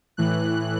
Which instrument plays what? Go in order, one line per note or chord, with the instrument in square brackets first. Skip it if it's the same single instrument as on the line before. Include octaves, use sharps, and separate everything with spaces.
[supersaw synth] A2 E3 F#6